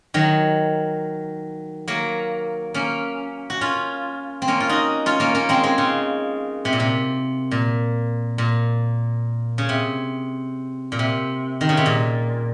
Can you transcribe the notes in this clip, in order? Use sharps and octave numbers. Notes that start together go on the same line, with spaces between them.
D#3 F#3
F#3 A#3
A#3 C#4
F#4
C#4 F4
C4
A#3 C#4
F4
D#4 F#4
C#4 F4
A#3 C#4
A#3 C#4
G#3 C4
G#3 C4
C#3
C3
A#2
C3
A#2
A#2
C#3
C3
A#2
C3
D#3
C#3
C3
A#2